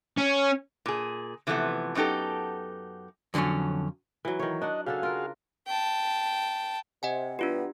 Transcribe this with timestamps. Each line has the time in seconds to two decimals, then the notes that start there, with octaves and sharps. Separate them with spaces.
0.18 C#4
0.86 A#2 G#4
1.47 C3 E3 F3 G#3 A3 B3
1.95 F#2 B3 D#4 G4 A4
3.34 F2 D3 F3 F#3 C#4
4.25 E3 F#3
4.39 D#3 E3 C#5
4.62 D4 D#5 F#5
4.86 C#3 D4 F#4 G#4 A4 F5
5.03 F4 A#4
5.68 G5 A5
7.03 C3 D#5 F#5 G#5
7.39 E3 G3 B3 D4 F4 G4